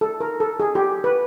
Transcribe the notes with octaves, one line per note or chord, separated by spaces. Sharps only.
A4
A#4
A4
G#4
G4
B4